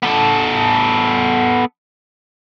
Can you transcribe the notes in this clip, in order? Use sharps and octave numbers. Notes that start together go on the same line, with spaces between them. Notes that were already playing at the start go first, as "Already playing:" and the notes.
B3 A4